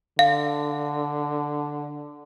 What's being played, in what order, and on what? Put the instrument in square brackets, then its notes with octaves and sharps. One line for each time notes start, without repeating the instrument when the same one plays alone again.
[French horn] D3 [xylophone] F5